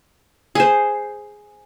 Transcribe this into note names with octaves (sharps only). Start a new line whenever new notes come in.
G#4 C5